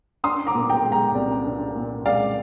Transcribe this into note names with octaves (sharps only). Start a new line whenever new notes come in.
D4 C6 D#6
A#5 D6
A#2
G5 A#5
G#3
G5 A#5
C2 D5
D4
A#2
G#3 D5 F5